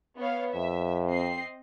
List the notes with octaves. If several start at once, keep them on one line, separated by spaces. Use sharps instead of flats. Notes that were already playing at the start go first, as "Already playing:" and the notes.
B3 C#5 F5
F2 E5
C4 D#5 C7